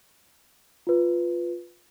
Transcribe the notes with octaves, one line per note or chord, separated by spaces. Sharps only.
F4 B4